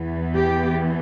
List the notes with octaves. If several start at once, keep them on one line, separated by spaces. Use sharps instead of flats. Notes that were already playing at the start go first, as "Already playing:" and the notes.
Already playing: E2 E3 B3
G4